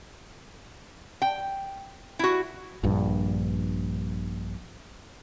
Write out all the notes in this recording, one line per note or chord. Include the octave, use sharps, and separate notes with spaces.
G5
E4 F#4
A#1 G2